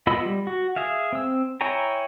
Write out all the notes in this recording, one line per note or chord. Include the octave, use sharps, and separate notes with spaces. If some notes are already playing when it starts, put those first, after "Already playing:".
B3 F4 D#5 B5 E6
G3
F#4
G#4 E5 F5
C4 E6
E4 C#5 G5 G#5 A#5